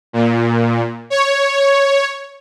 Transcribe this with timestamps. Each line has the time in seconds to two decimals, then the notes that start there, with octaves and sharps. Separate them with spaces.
0.13 A#2
1.10 C#5